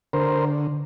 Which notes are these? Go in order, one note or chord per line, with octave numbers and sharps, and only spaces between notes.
D3 A#4 C5